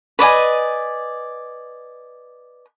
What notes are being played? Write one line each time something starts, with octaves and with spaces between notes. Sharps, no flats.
B4 D5 D#5 G#5